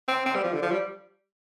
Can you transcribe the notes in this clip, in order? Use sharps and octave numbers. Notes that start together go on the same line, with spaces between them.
C4
C4
G3
F3
D3
F3
G3